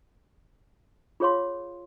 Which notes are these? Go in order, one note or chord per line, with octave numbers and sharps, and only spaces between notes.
F4 G#4 C#5 F5 C6